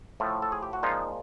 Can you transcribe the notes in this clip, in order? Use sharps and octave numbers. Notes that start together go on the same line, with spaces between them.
A2 F3 A3
A4
G#4
G4
F#4
A#2 F3 G#3 D#4 F4